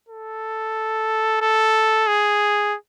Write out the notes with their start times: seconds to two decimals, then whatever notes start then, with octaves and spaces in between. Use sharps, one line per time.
0.09 A4
1.42 A4
2.07 G#4